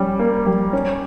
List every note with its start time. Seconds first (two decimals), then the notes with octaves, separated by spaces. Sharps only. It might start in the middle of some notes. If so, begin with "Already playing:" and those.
Already playing: G3 C#4
0.19 A#3
0.46 G3
0.73 C#4